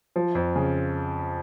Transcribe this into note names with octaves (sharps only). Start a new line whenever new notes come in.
F3
F2
C#3